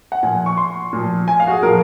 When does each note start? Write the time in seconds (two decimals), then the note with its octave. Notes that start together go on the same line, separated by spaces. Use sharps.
0.12 F#5
0.23 A#2 F3 G#5
0.46 C#6
0.57 C6
0.93 A#2 F3
1.28 G#5
1.40 F5
1.47 F#4
1.51 G#4
1.63 A#2 F3 A#4